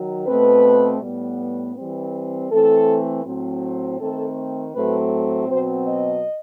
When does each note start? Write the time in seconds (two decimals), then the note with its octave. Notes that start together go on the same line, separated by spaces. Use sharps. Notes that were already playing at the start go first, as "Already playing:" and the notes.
Already playing: D#3 F#3
0.27 B2 A3 C4 B4
1.02 A2 G3 B3
1.76 E3 G3 C4
2.51 E3 A3 C4 A4
3.25 A2 F#3 C4
3.99 D#3 A3 C4 A4
4.74 A2 F#3 A3 C4 B4
5.48 B2 F#3 C4 C5
5.86 D#5